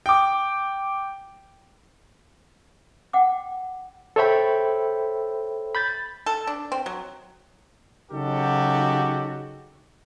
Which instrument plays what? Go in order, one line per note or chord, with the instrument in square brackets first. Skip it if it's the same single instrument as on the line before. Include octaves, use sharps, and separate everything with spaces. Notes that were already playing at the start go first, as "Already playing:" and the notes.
[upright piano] G5 D6
[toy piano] F#5 G5 D6
[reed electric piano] A4 C5 C#5 E5 G5 B5
B5 G6 A6
[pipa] A4
D4
C4
F#3
[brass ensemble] C#3 F#3 D#4 F#4 G4 A4